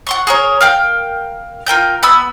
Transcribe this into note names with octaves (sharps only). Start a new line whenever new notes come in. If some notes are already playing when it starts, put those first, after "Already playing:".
F#5 C6 C#6
G#4 A#4 C#5
A#4 F5 G5
F4 A#4 G5 G6
B3 B5 E6